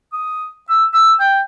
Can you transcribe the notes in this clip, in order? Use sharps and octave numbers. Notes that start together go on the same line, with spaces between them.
D#6
E6
E6
G5